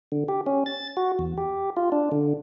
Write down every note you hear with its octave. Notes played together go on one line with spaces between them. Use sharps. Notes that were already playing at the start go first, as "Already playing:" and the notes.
D3
G4
C#4
A6
F#4
E2
G4
F4
D4
D3